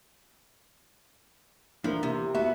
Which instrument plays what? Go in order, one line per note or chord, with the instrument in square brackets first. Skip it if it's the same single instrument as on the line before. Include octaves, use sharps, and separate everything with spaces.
[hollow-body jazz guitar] E2 D4 E4 [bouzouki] F3 [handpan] A#3 A#4
[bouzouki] C3
[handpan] A#3 E4 [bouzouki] B3 F#4 [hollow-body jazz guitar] E5